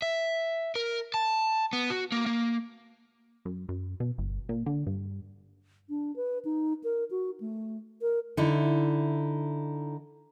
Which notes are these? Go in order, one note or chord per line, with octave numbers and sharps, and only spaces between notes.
E5
A#4
A5
B3
F#4
A#3
A#3
F#2
F#2
B2
G1
A#2
D3
G2
D4
B4
D#4
A#4
F#4
A3
A#4
D3 D#4 E4